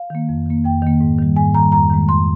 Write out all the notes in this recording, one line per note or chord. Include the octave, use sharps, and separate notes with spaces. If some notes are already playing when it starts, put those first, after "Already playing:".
Already playing: F5
D#3 A#3
F2
D#3 A#3
F2 G5
D#3 A#3
G#2
D#3 G3
G#2 G#5
D#3 G3 A#5
F2 A#5
D#3 G#3
F2 C6